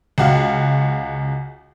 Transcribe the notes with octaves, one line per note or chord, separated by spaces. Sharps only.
C#2 F#4 F5